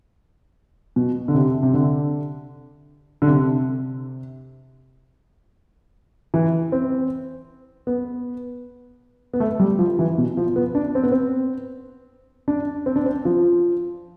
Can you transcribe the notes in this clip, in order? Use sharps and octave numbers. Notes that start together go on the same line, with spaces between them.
B2
D3
C3
C3
D3
D3
C3
E3
C4
B3
B3
A3
G3
F3
E3
B2
F3
B3
D4
C4
B3
C4
D4
C4
D4
C4
F3